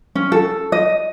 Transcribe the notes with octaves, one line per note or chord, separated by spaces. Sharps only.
C#4
A4
D#5